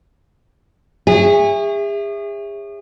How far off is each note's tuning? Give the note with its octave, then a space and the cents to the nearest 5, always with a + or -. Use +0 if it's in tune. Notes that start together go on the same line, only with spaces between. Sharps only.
G#4 -40 C#5 +0 E5 +0